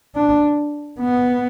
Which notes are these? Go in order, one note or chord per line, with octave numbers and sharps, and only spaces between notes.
D4
B3